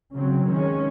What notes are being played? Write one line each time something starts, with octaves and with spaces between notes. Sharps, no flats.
C#3 F#3 C4
D#3 G#3 C#4